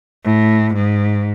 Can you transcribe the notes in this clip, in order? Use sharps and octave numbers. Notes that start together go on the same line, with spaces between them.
A2
G#2